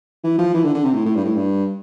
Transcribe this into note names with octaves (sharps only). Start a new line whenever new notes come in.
E3
F3
E3
D3
D3
C3
A2
A2
G2
A2
G2